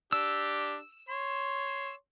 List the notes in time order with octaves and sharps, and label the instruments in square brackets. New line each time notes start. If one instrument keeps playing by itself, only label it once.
[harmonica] D4 G4 [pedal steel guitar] E6
[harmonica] C#5 C6